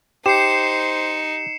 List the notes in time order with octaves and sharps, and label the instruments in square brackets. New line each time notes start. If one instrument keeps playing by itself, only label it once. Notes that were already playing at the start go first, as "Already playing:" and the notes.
[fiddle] D#4 [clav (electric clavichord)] G4 [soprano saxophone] C5 [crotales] C7 C#7 E7